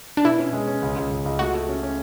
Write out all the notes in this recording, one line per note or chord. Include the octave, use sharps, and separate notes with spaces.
D4
B2 E4
C#4
G#3
C#4
C#2
C#2
C#2
C#2
A3 F#4
A3
C#4
C#4